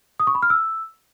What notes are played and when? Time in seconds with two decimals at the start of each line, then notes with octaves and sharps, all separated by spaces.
0.20 D#6
0.27 C#6
0.35 B5
0.42 F6
0.50 E6